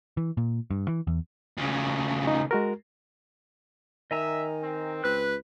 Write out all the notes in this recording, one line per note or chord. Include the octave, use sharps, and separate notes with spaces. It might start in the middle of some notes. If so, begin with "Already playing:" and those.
E3
A#2
G2
E3
E2
D2 C#3
D#4
G#3 F#4 A#4
D#3 D#5 E5 G#5 A#5
C4
C#2 B4 F#6